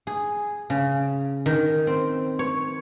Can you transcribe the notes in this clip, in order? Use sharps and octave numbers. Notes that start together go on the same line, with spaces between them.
G#4
C#3
D#3
C4
C#5